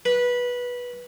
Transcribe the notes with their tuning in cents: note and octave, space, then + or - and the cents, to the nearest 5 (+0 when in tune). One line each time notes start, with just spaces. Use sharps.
B4 -15